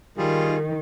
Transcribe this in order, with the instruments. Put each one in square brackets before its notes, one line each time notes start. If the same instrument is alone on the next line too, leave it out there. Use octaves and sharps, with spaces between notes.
[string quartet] D#3 [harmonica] G3 F4 G#4